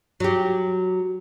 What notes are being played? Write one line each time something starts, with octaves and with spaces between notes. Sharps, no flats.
F#3 G4